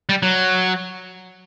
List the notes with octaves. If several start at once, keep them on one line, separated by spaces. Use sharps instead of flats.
G3
F#3